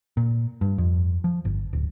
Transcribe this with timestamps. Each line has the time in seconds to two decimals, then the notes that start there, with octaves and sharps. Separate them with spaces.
0.17 A#2
0.61 G2
0.78 F2
1.24 F3
1.45 G1
1.73 D1